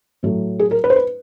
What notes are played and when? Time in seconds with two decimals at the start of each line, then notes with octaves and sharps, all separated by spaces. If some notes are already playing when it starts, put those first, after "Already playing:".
0.23 A2 F#3 A3
0.59 G#4
0.71 A#4
0.84 B4
0.90 C5
0.96 B4